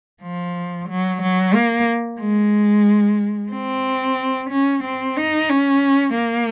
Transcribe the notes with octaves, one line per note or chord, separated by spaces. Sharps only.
F3
F#3
F#3
A#3
G#3
C4
C#4
C4
D#4
C#4
A#3